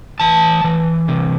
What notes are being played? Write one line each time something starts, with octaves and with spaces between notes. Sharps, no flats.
E3 A5
E3
C3